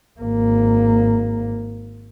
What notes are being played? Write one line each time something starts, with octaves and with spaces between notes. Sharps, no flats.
G#1 A#3